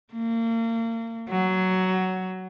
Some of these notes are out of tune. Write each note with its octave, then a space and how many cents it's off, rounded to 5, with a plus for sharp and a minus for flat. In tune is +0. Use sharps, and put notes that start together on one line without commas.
A#3 -35
F#3 +10